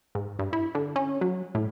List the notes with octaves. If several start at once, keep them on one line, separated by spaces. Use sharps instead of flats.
G#2
G2
E4
D3
C#4
F#3
A2